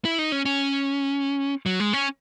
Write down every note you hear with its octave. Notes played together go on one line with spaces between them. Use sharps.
E4
D#4
C#4
C#4
F#3
G#3
C#4